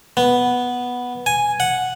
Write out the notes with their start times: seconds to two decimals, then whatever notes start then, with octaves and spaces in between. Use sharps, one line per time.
0.17 B3
1.26 G#5
1.60 F#5